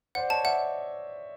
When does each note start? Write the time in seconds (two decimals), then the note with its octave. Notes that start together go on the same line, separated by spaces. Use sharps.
0.15 C5 D5 F#5
0.30 C#5 D#5 A5
0.44 D5 E5 F#5